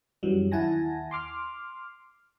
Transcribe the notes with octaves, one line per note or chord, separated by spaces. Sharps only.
F#2 E3 F#3 G3
D#2 E4 F#5 G#5 A5 A#6
C6 D6 F6